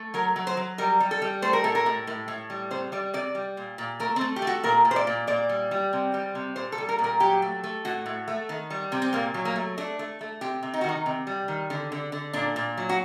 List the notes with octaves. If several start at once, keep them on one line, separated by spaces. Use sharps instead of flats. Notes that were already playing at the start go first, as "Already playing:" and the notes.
Already playing: A3
F#3 A#4
F#3
C5
F#3
G3 A#4
G3
A4
G3
A3 C5
A#4
A2 A4
A#4
A2
A2
A2
G3
C3 C5
G3 D5
C3 D5
G3
A#2
A#2
A3 A#4
C4
A3
G4
A3
F#4
A#2 A#4
A#2
C5
D5
A#2
A#2 D5
G3
G3
C3
G3
C3
A#2 C5
A4
G3
A#4
A#2
A#4
F#3 G4
A3
A3
A2 F#4
A2
A3
D#3
G3
C3
C4
A#2 A#3
F#3
A#3
A3
A3 D4
A3
A3
C3 G4
C3
D#4
F#4
D#3 D#4
C3
G3
D#3
D3
D3
D3
A#2 D4
A#2
F#3
F#4